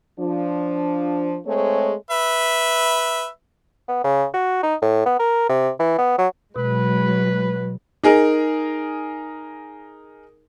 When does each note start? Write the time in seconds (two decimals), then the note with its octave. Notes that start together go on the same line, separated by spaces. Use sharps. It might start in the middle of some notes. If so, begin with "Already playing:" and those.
0.19 F3 D4
1.46 G#3 A3 C4 G#4 C#5
2.11 B4 E5
3.88 B3
4.04 C#3
4.34 F#4
4.63 D#4
4.82 A2
5.06 B3
5.19 A#4
5.49 C3
5.79 E3
5.98 B3
6.18 F#3
6.56 B2 F#3 G#3 B4
8.03 D#4 G#4 A#4